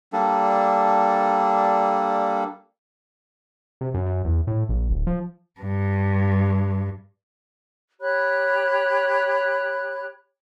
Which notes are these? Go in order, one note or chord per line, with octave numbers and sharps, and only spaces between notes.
G3 A#3 D4 A4
C3
F#2
F#2
E2
A2
A#1
D1
F3
G2
G4 C#5 B5 F#6